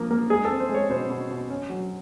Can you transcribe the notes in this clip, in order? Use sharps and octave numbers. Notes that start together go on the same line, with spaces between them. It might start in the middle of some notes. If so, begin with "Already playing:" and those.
Already playing: F3 A#3
A#3
G#3 G#4
A4
C4
C5
G#3
C#5
B2 C5
B2
B2
C#4
F#3